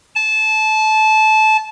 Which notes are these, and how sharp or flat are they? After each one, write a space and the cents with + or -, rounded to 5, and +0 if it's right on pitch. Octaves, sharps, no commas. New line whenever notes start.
A5 -20